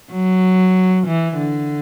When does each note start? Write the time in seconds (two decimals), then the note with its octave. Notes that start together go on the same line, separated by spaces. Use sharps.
0.12 F#3
1.06 E3
1.38 D3